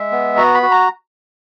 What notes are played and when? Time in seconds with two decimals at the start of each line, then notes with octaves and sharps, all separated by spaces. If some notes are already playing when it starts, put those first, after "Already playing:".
Already playing: G#3 E5
0.12 B3
0.37 F#4 A#5
0.54 B5
0.62 F#4
0.71 A#5